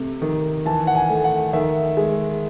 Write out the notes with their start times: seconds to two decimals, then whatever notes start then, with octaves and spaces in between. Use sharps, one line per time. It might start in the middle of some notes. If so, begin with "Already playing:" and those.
Already playing: C3 A3
0.22 D#3
0.65 E3 A5
0.87 F#5
0.95 G#5
1.09 A3
1.24 F#5
1.53 D#3 E5
1.97 G#3